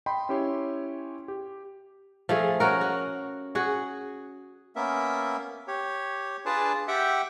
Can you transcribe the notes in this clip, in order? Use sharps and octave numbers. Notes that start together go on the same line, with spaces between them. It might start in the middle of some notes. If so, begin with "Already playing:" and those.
D#5 G5 B5 C6
C#4 E4 G4 C#5 C6
G4
F3 A3 G#4
C#4 F#4 A#4
F#4
F#4 G#4
A#3 B3 C#4 A#4 E5
G4 C#5
D4 F4 G#4 B4 D5 A5
G4 E5 F#5 G5